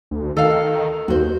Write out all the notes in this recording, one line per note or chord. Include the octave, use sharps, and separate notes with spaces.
D2
D#3 A4 F5
D#2 F#4 C5